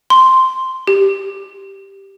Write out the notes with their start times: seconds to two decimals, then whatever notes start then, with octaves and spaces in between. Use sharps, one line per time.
0.10 C6
0.87 G4